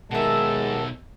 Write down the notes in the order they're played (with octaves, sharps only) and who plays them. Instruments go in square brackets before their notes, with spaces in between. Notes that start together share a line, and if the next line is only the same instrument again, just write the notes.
[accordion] D#2 D#3 A5 [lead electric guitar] B2 D#4 [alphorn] G#3 [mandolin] F#4 E5